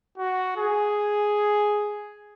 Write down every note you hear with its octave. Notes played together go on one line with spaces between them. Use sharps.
F#4
G#4